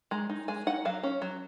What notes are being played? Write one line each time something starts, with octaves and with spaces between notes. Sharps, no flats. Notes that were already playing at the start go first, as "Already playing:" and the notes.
G#3 A#5
D#4
G#3 G#5
D#4 F#5
F#3 F5
C#4
F#3